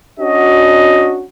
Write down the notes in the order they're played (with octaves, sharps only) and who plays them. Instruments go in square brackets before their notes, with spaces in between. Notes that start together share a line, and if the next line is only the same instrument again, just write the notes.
[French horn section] C#4 D4 F#4 [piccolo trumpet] D#5